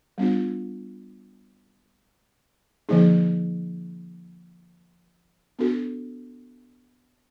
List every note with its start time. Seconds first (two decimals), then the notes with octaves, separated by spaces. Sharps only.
0.18 G3 B3 D4 F4
2.89 D3 F3 A#3 D#4 G#4
5.59 B3 D4 F#4 A4